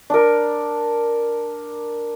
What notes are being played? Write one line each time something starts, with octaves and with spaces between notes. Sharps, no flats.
D4 A#4